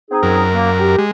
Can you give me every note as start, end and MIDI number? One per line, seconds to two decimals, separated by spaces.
0.09 0.42 60
0.09 0.42 63
0.09 0.42 68
0.23 0.96 42
0.23 0.96 70
0.53 0.69 58
0.78 1.00 67
0.99 1.11 56